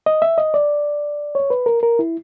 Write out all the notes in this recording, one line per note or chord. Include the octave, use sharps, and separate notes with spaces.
D#5
E5
D#5
D5
C#5
B4
A#4
A#4
E4